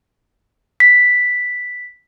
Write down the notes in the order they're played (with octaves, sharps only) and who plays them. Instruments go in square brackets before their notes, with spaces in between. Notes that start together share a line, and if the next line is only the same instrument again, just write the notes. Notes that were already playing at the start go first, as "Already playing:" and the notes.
[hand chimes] B6